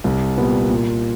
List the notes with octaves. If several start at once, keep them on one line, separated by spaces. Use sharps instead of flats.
C2
A#2 G3 B3
A#2